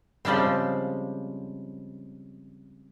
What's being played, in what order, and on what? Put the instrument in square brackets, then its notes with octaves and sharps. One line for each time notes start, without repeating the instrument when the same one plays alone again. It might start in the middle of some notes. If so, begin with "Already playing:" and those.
[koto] C#3 F3 G3 G#3 C4